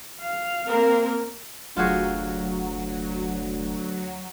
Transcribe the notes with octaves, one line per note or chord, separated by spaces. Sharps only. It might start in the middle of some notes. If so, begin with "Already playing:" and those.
F5
A#3 C4 A#4
F1 D2 F#3 F4 F#4 G#4